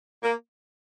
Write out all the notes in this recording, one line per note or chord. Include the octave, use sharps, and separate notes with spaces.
A#3